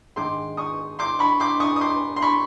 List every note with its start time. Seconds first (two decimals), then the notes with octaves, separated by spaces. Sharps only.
0.16 G#2 D#3 G#3 C6 D6
0.57 C#6 D#6
0.99 C6 D6
1.19 B5 C#6
1.40 C6 D6
1.60 C#6 D#6
1.76 D#6
1.81 C6 D6
2.16 C6
2.22 B5 C#6